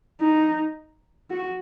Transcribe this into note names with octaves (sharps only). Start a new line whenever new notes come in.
D#4
F#4